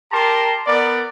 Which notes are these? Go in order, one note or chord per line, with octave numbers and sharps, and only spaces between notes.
G4 A#4 A5 A#5 C6
B3 A#4 D5